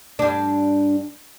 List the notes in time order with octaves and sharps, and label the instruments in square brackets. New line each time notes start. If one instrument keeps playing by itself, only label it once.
[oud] G2 D4